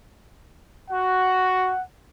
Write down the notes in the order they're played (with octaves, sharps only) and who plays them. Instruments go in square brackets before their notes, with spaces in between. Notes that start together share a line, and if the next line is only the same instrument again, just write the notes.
[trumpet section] F#4 [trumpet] F#5